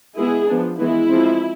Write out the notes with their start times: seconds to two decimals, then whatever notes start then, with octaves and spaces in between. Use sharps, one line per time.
0.16 E3 G#3 B3 E4 G#4
0.48 F3 B3 D4
0.79 E3 G#3 B3 E4
1.10 F3 G#3 C4